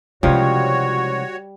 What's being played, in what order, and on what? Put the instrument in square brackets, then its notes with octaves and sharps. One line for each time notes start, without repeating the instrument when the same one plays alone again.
[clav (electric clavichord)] C#2 F3 [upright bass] C3 E4 [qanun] G3 [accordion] F#4 C#5